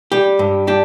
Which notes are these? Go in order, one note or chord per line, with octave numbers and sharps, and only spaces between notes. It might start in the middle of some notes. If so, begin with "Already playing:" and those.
G3 G4
G2
D4 G4